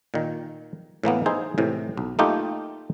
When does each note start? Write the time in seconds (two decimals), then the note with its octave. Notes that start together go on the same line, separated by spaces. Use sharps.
0.14 A#2 D#3
1.03 A2 E3 A#3 B3
1.26 D#4 E4 G#4 C5
1.58 A2 C3 E3
1.97 B1
2.19 A3 A#3 D#4 F4 G4